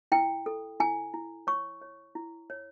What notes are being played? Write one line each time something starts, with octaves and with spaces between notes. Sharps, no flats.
E4 G5
A4
E4 G#5
E4
C#5 C#6
C#5
E4
C#5